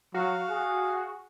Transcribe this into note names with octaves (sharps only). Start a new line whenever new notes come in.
F#3 F#4 F5
G#4